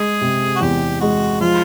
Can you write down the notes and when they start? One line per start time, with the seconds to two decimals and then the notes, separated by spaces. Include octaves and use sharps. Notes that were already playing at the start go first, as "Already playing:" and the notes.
Already playing: G#3 G#4
0.21 C3
0.56 F#4
0.61 E2 G4
1.01 G#3 F#4
1.41 F3 F4